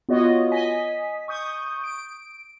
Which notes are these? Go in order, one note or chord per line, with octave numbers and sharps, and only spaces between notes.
B3 F4 F#4 C#5 D#5
D#5 G#5 B6
C#6 D#6 G6
D7